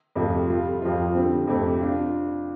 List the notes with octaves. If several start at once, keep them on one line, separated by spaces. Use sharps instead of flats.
F2 C3 F3 A3 F4
G3 F4 A4
F2 F3 C4 F4
D3 G3 C4
F2 C3 A3 C4 G4
D4 F4